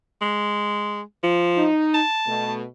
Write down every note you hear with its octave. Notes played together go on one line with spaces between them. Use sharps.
G#3
F3
D#4
A5
B2 A3